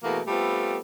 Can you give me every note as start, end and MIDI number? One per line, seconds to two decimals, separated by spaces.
0.04 0.20 47
0.04 0.20 52
0.04 0.20 57
0.04 0.20 58
0.04 0.20 66
0.04 0.20 68
0.27 0.78 55
0.27 0.78 57
0.27 0.78 59
0.27 0.78 60
0.27 0.78 65
0.27 0.78 69